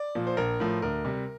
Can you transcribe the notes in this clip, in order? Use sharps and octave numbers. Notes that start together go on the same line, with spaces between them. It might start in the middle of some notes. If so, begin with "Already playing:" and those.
Already playing: D5
A#2 F3
C5
A#1 A#4
A2 F3
D2 A#4
C3 G3